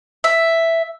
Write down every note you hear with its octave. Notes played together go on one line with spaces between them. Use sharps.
E5